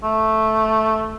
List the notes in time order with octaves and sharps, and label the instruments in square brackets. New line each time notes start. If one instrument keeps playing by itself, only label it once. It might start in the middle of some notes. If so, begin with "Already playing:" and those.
[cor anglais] A3